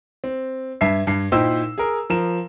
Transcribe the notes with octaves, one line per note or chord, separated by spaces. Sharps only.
C4
G2 E5 C7
G2 C7
A#2 D#4 E4 C5 G5 E6
G#4 A#4
F3 A#4 E7